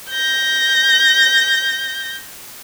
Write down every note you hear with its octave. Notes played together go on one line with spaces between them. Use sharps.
G6 A#6